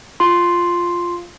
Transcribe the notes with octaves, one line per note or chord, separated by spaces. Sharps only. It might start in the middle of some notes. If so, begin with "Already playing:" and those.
F4 C6